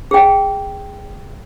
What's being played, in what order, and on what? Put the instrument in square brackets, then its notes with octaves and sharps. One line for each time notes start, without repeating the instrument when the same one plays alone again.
[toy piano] G#4 G5